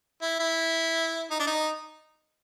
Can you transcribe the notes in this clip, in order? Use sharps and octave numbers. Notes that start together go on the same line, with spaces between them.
E4
E4
D#4
D4
D#4